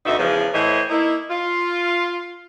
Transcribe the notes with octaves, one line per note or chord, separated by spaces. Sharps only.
D2 B2 D#4 E5
E2 C#3 E3 F3
A2 E3 C5 C#5 D#5
A#3 D#4 E4
F4